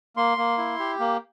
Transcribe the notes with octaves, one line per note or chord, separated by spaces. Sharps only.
A#3 C6
A#3
E4
G4
A#3